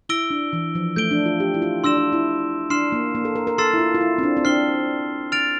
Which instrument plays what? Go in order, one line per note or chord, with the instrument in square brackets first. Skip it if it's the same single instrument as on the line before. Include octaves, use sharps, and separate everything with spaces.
[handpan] E4 [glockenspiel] E6 A#6 D7 G7
[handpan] D4
E3
F3
[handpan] A3 [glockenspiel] G6 D7 G7
[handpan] D4
F4
G4
E4
F4
[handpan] D4 [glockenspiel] C6 E6 A#6 E7
[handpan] D4
E4
[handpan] D4 [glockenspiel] C6 F6 C7 E7
[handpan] A#3
A#3
A4
A#4
A#4
[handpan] A4 [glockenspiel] C6 E6 A6 C7 E7
[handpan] E4
F4
F4
E4
C4
D4
C4
[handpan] D4 [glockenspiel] F6 C7 G7
[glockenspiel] F6 A6 D7 F7